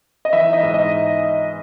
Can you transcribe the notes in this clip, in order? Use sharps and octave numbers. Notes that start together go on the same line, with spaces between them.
D#5
E3 E5
D#4 D#5
G#2
D#5
D#4